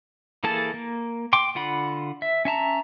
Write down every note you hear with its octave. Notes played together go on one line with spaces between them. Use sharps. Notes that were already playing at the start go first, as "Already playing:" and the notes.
E3 A#3 G#4 A4 A5
A#3
G5 C6 D6
D3 F4 F#5 B5
E5
C#4 E5 A5 A#5